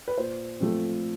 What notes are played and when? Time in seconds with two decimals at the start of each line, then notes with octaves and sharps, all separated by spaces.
0.08 B4
0.18 A#2 C5
0.60 F3 A3 C4